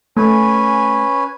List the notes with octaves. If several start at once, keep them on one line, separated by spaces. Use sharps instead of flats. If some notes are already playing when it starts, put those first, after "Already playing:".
A3 C#4 B4 G#5